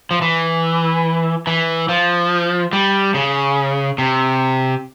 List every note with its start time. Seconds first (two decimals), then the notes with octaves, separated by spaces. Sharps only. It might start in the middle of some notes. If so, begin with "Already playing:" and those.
0.11 F3
0.22 E3
1.47 E3
1.89 F3
2.73 G3
3.14 C#3
3.98 C3